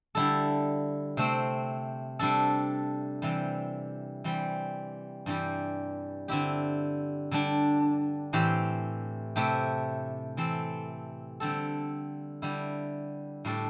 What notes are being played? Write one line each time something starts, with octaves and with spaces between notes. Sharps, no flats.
D3 G3 E4 A4
C3 A3 C4
C3 G3 D4 A4
C3 E3 G3
E3 G3 C4 G4
G2 E3 G3 E4 G4
D3 C4 E4 G4
D3 G3 D4
A2 E3 C4 G4
C3 A3 E4 G4
E3 C4 A4
D3 G3 C4 A4
D3 G3 E4 G4
A2 G3 D4 A4